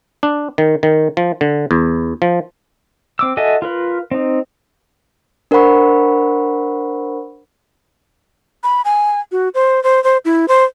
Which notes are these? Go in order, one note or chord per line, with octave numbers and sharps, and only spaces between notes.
D4
D#3
D#3
F3
D3
E2
F3
C4 D6 E6
F#4 A4 D#5 E5 G#5
F4 A#4 B4
C4 D#4
D4 A#4 C5 F#5 B5 C#6
B5
G#5
F#4
C5
C5
C5
E4
C5